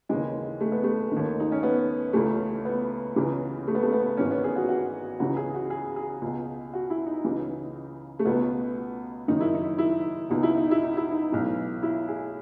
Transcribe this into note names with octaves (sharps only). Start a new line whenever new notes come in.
D#2 C#3 E3 G#3
A3
B3
A3
D#2 D#3
D#4
C#4
B3
C#2 C#3 E3 A3
B3
C#2 C#3 E3
A3
B3
A3
B3
G#1 G#2 E3 C#4
B3
G#4
F#4
F#4
C#2 C#3 E3 F#4
G#4
F#4
G#4
G#4
C#2 B2
F#4
E4
D#4
C#2 C#3 E3
A3
C#2 B2 B3
F#1 F#2 D#3 D#4
E4
D#4
E4
C#2 B2 D#4
E4
D#4
E4
D#4
E4
D#4
B1 A2 E3
E4
G#4